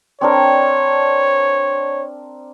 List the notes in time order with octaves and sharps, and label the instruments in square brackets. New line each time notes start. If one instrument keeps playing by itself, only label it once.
[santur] C4 D4 A#4 [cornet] C#5